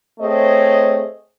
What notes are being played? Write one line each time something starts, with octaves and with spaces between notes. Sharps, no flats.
A3 C4 G#4 C#5 D#5